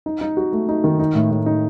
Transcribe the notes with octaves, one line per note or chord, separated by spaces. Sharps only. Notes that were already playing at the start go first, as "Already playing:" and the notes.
D#4
D#4
F#4
A3
D#4
D#3
D#4
A2
A2
D#4